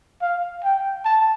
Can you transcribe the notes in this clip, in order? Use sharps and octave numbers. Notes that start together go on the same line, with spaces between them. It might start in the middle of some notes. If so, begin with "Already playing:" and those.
F5
G5
A5